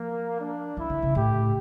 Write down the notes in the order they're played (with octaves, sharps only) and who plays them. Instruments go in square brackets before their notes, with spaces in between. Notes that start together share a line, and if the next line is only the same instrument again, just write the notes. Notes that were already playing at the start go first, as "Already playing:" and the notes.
Already playing: [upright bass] F3 [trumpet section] A#3
[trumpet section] D4
[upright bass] E3 [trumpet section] E4
[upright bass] D3
C#3
[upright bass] A2 [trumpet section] G4